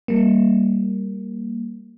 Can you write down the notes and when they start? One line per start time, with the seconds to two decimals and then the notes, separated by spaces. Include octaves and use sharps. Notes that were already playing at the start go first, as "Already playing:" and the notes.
0.08 G3 A#3